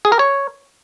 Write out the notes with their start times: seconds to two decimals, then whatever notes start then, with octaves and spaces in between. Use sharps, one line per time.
0.05 G#4
0.12 A#4
0.19 C#5